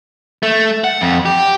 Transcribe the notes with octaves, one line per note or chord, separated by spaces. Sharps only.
A3
F#5
F2
G4